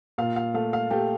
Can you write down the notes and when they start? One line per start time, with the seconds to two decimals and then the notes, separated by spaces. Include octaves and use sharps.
0.18 A#2 F5
0.36 F5
0.54 A3 F5
0.73 F5
0.91 A3 G4